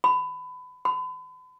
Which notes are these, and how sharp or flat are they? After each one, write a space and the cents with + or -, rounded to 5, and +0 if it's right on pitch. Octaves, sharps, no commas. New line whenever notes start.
B5 +25
B5 +40